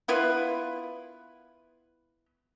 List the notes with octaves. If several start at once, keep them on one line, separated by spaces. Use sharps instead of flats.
B3 E4 F4 B4